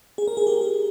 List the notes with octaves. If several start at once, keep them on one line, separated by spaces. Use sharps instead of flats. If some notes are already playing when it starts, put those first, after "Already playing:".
G#4
A#4
G#4
G4
G#4